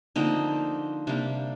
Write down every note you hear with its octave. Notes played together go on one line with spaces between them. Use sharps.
D3 F3 A#3 C4 D#4
C3 G3 A#3 D4